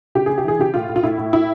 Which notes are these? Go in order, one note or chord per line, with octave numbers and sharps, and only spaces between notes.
C#3 G4
C#3 G#4
G4
E3 G#4
C#3 G4
A2 F4
A2
F4
A2 E4
A2
A2 E4